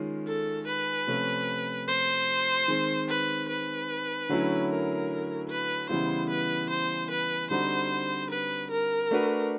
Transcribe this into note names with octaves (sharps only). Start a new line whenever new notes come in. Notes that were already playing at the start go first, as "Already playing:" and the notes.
Already playing: D#3 G#3 C#4 F4
A4
B4
C3 F3 A3 C#4 F4
C5
D#3 G#3 C4
B4
B4
D3 F#3 A3 C#4 E4
A#4
B4
C#3 E3 G3 B3 E4 C5
B4
C5
B4
D3 G3 C4 D#4 F#4 C5
B4
A#4
A3 D4 F#4 B4